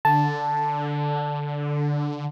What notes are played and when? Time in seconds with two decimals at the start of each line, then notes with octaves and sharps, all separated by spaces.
0.05 D3 A5